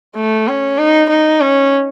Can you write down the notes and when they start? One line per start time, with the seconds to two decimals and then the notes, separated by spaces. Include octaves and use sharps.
0.16 A3
0.47 C#4
0.78 D#4
1.10 D#4
1.41 C#4